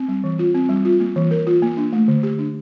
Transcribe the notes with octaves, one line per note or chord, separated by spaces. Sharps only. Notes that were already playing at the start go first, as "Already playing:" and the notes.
Already playing: C4
G3
E3
F4
C4
G3
F4
A#3
E3
A#4
F4
A#3
D4
A3
D3
G4
D4